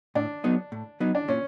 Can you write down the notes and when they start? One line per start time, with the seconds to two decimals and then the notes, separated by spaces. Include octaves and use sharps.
0.15 A2 D4
0.44 F#3 B3 D#4
0.72 A2
1.00 F#3 B3 D#4
1.15 D4
1.28 A#2 C#4